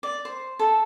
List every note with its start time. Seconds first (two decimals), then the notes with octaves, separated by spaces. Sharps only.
0.03 D5
0.25 C5
0.59 A4